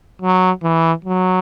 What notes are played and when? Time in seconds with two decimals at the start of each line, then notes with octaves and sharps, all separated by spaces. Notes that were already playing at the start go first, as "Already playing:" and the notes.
0.22 F#3
0.63 E3
1.05 F#3